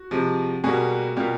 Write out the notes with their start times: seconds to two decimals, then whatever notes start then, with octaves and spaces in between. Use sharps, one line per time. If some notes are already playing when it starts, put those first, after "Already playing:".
Already playing: F#4
0.11 C3 F3 G#3
0.64 B2 G3 A#3 F#4 G#4
1.16 B2 G3 A#3 F4 G4